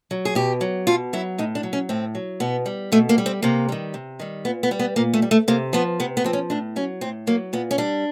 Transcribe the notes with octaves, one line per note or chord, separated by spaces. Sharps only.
F#3
G#4
B2 G4
F#3
B2 F4
F#3 E4
A2 D#4
D4
F#3
C#4
A2 C4
F#3
B2 B3
G3
B2 A3
A#3
G3
C4
C3 A#3
D#3 G3
C3
D#3 G3
A#2 B3
B3
G3
B3
A#2 A#3
A3
G3
A3
C3 A#3
F3 B3
C3 B3
B3
F3 C4
C#4
A2 D4
F#3 C#4
A2 C4
F#3 A#3
A#2 B3
C#4
G3 D4